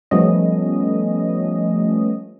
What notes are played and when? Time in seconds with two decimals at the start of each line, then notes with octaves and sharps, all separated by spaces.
0.11 F3 G3 A3 B3 C#4 D#5